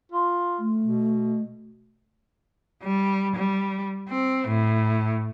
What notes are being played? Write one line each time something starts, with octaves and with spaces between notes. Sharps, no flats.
F4
A3
B2
G3
G3
C4
A2